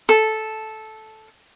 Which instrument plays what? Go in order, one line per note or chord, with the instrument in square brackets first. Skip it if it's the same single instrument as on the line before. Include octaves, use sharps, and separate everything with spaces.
[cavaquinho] A4